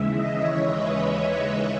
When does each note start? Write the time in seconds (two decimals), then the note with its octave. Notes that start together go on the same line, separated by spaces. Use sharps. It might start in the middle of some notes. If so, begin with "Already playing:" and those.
Already playing: D#2 C#3 E3 G#3 E5
0.13 D#5
0.43 C#5
0.73 B4